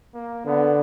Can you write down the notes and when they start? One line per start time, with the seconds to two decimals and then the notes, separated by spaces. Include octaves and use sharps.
0.15 A#3
0.45 D3 B3